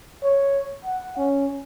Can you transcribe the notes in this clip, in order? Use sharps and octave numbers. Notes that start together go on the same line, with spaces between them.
C#5
F#5
C#4